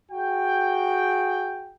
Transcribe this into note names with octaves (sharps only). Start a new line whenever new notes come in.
F#4 G#4 G5